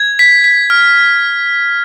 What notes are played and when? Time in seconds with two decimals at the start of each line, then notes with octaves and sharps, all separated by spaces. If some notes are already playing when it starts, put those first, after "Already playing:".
Already playing: G#6
0.19 B6
0.44 B6
0.70 F6